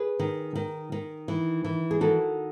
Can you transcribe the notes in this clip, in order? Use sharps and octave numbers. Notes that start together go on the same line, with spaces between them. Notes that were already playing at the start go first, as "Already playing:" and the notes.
Already playing: G#4 B4
D#3
D#3
D#3
E3
E3
G#4
D#3 F#4 A4